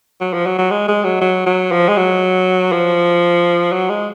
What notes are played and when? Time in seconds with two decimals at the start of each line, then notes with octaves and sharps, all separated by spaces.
0.21 F#3
0.33 F3
0.46 F#3
0.58 F#3
0.71 G#3
0.88 G#3
1.04 F#3
1.21 F#3
1.46 F#3
1.72 F3
1.88 G#3
1.97 F#3
2.72 F3
3.72 F#3
3.89 G#3